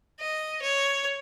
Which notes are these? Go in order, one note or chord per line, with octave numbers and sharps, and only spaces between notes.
D#5
C#5